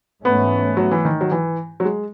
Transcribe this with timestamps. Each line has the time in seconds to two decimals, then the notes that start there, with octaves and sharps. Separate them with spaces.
0.24 G#2 E3 A3 B3 C#4
0.77 F#3
0.91 E3
1.05 D#3
1.21 F#3
1.31 E3
1.80 F#3
1.85 G#3